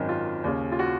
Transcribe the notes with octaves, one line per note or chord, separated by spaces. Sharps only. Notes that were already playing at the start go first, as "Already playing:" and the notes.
Already playing: G#1 F#2 D#3
F4
D#2 C#3
F4
F#4